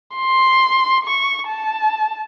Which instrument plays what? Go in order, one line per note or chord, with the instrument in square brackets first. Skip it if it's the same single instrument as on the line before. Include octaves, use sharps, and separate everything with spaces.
[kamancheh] C6
C#6
A5